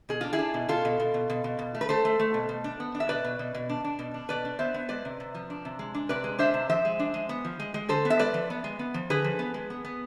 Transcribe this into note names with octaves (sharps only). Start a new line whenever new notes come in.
B2 G#4
D4 F4
E4 G#4
D4
B2
B2 F4 A4
B2
B2
B2
B2
B2
B2
A3
B4
A3 A4 C5
A3
A3
B2
B2
D4
B3
D4
E5
B2 B4 D5
B2
B2
B2
D4
D4
B2
D4
B2 B4 D5
D4
B3 C5 E5
B3
G#3 B4 D5
C3
C3
F3
D4
C3
G#3
D4
C3 B4 D5
G#3
D4 C5 E5
C3
F3 C5 E5
G#3
D4
G#3
B3
F3
G#3
G#3
D3 A4 C5
B3
E5
G#3 B4 D5
F3
B3
G#3
B3
F3
D3 G#4 B4
F3
B3
G#3
B3
B3